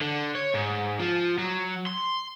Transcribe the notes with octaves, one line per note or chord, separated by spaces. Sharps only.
D3
C#5
G#2
F3
F#3
C6